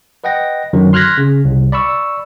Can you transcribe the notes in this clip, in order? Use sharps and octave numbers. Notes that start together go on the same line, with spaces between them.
B4 D#5 F#5 G5 A#6
F#2 D3 D#3 F#3
C6 F6 F#6 G#6 A#6 B6
C#3
C2
D5 B5 C#6 E6